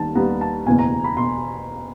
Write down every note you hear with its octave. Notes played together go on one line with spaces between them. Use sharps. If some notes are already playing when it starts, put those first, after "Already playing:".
Already playing: D#2 D#3 G3 B3 A5
D#2 D#3 G3 B3 A#5
A5
F#1 E2 B2 G#5
A#5
B5
B2 C6